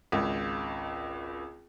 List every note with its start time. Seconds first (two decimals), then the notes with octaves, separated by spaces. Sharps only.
0.12 G#1 C#2